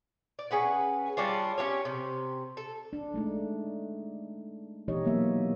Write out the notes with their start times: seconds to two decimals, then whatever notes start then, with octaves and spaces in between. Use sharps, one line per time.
0.39 D5
0.51 C#4 G#4 B4 F#5
1.17 G3 C#4 D4 F4
1.58 C#4 F4 G4 C#5
1.85 C3
2.57 A4
2.93 D4
3.14 G#3 A3 D#4
4.88 B2 E3 D#4 G4 C#5 D#5
5.05 F#3 A#3 B3 E5